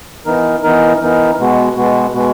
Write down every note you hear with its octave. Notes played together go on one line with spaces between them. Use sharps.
E3 B3 D#4 A#4
E3 B3 D#4 A#4
E3 B3 D#4 A#4
B2 G#3 B3 F#4
B2 G#3 B3 F#4
B2 G#3 B3 F#4